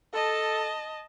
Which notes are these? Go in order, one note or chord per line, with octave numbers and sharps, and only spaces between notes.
A4 D#5 A5